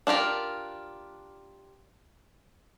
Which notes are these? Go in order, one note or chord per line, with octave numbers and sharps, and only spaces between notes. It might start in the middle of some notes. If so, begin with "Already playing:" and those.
D4 F4 G4 A#4